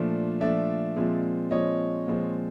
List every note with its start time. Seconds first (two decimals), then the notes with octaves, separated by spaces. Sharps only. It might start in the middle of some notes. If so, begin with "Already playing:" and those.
Already playing: A#2 F3 A3 D4
0.41 A#2 F3 A3 D4 D5 E5
0.96 A#2 F3 G#3 C4
1.51 A#2 F3 G#3 C4 C#5 D#5
2.07 A#2 F3 G#3 C4